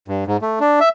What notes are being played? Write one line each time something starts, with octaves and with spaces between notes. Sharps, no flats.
G2
G#2
A3
D4
E5